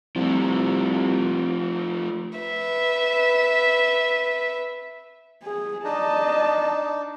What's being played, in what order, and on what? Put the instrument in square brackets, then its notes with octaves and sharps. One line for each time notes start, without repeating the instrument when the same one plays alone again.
[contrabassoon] C2 [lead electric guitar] F3 A3
[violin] B4 E5
[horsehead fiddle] G#4
[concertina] D4 D#4 [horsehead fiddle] D#5 A5